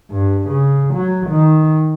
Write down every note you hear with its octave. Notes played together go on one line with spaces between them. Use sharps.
G2
C#3
F#3
D#3